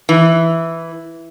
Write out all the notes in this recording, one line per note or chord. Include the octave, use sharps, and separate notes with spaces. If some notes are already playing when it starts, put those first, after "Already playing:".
E3